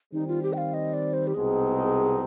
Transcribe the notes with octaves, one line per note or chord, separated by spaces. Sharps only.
D#3 G3 C4 D#4
F4
G4
G5
F5
D#5
D5
C5
G4
C2 B2 G#3 C4 D#4 G#4